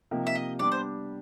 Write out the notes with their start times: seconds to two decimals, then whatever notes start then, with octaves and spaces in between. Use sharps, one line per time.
0.11 C3 F3 A#3 D#4 G4
0.27 E5
0.35 D#5
0.59 G3 B3 D4 G4 D5
0.72 C5